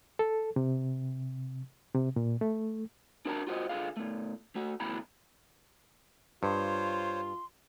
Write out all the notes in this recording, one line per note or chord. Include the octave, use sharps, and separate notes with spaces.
A4
C3
C3
A#2
A3
D4 F#4 A#4 B4 A5 A#5
F4 F#4 C5 D#5
D3 F4 G#4 F5
B2 A3
A3 F#4
D2 B2 A3 E4 A#5 B5
G2 F4 C5 C#5 C6